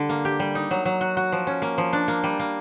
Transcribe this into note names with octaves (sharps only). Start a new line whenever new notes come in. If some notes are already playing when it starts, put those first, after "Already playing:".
Already playing: D3 G3
A#3
G4
G3
D#4
F#3
F#3
F#4
F#4
F3
C#4
A#3
F3
D4
A#3
G3
A#3